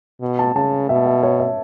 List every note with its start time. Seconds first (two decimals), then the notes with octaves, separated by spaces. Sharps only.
0.21 B2
0.39 A5
0.55 C#3 A5
0.89 B2 E5
1.06 E5
1.23 C#5
1.40 E5